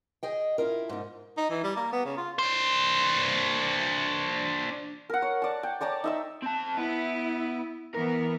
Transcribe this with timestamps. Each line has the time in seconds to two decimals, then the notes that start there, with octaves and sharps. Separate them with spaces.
0.23 G#4 D#5 G5
0.58 E4 F4 A#4
0.89 G#2 D#4
1.37 D#4
1.50 E3
1.64 G3
1.76 A#3
1.93 B3
2.05 C#3
2.17 F4
2.39 D4 C5
5.10 A#4 F#5
5.22 C#5
5.42 D5 A5
5.63 G5
5.81 C#5 D5 A5 A#5
6.04 D#4 E5 E6
6.43 C4 A5
6.78 B3 E4
7.94 E3 B3 A#4